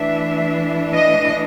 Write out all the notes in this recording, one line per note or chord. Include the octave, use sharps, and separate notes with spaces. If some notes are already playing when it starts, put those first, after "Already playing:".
Already playing: E3 A3 D4 E5
D#5